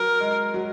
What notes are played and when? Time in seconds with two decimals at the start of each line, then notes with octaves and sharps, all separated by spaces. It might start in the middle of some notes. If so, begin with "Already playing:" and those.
Already playing: F#3 A#4
0.20 G#3
0.54 F#3